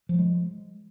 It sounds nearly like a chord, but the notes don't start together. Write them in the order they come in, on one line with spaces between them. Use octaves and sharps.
F3 F#3 G#3